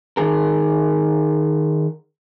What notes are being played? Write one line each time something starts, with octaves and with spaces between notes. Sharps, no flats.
D#3 G#4 A#4